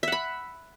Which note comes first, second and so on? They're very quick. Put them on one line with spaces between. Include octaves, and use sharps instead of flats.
E5 F#5 B5